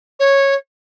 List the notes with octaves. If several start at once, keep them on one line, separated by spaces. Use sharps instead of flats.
C#5